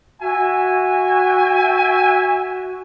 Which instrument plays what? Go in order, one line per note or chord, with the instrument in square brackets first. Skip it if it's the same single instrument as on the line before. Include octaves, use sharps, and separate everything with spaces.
[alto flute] F#4 [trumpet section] E5 G#5